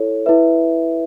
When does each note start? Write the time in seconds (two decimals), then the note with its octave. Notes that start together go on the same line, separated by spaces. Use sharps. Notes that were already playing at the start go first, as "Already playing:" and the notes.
Already playing: E4 A4 C#5
0.26 E4 B4 E5